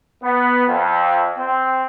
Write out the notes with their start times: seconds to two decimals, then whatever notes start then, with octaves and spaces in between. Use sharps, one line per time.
0.22 B3
0.67 F2
1.38 C4